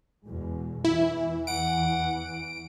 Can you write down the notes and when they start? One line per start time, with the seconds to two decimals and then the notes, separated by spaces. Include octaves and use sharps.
0.27 E2 B2 G#3
0.85 E2 E3 E4
1.47 F#5 D7